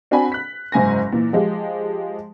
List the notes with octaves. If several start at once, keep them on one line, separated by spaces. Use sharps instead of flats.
C4 D4 F#4 F#5 G#5 B5
F#6 B6
F#1 G#2 G#5 A#6
A#2 E3
F3 G#3 G4